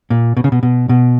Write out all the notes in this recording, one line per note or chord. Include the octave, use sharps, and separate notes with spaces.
A#2
B2
C#3
B2
B2
B2